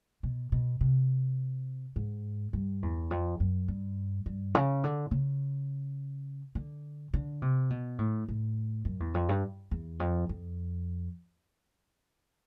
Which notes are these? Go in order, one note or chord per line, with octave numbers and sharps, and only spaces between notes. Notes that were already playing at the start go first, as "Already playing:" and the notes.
B2
B2
C3
G#2
G2
E2
F2
F#2
G2
G2
C#3
D3
C#3
D3
D3
C3
B2
A2
A2
F#2
E2
F2
G2
E2
F2
F2